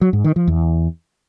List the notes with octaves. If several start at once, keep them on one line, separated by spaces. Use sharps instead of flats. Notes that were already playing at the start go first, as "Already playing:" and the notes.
F#3
G#2
D#3
F3
E2